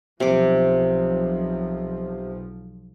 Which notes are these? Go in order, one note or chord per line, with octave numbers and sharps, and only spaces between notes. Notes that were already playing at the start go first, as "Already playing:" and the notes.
B1 C3 F3 D6